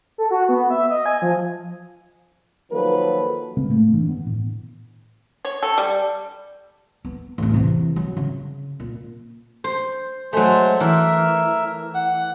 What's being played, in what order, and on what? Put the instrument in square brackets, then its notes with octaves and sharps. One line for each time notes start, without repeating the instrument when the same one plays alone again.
[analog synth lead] A4
F#4
B3
E5
D#5
G#5
F3
[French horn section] D#3 F3 F#3 A#3 A4 B4
[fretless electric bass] C#3 G#3 C4
A2 A3 A#3
G2 E3 D4
D#3 B3
A2
[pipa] C#5
A4
G3
[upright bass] B3
A1 E2
C3 E3
F#3
C#3
A#2
[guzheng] C5
[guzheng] F#3 A3 [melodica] G#3 C5
[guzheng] E3 [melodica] A#4 E5
[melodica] F#5